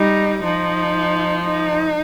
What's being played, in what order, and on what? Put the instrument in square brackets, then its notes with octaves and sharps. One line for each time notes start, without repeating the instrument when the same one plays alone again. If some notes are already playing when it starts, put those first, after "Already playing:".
Already playing: [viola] G3 [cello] D#4
[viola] F3 [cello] D#4
[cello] D#4